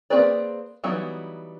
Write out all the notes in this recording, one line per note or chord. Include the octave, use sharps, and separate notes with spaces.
A#3 C4 G#4 B4 D5
E3 F#3 G3 B3 D#4